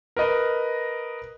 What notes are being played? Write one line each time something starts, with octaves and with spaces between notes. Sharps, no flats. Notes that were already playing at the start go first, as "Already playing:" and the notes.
A#4 B4 D#5